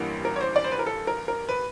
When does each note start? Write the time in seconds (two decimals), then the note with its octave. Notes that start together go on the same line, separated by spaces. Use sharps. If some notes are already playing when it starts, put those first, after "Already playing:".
Already playing: A1 G2 E3 G3 A#3
0.25 A#4
0.36 C#5
0.41 C5
0.56 D5
0.64 C5
0.72 B4
0.79 A#4
0.86 A4
1.07 A#4
1.28 A#4
1.49 B4